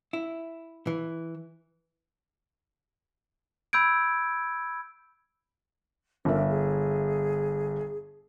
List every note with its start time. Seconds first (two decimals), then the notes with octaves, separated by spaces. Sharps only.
0.13 E4
0.87 E3
3.73 B5 E6 G6 G#6 D7
6.25 G1 D4 A#4 E5
6.49 G#4